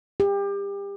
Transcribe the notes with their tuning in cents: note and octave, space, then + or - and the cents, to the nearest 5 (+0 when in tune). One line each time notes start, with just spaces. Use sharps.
G4 +30